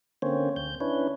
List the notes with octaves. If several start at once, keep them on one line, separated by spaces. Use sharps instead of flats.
D3 A#3 C4 C#4 C5 C#5
D2 G6
C#4 D4 E4 B4 C#5